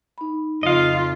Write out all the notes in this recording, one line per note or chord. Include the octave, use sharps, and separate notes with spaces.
D#4 B5
F2 C#3 F4 D#5 F5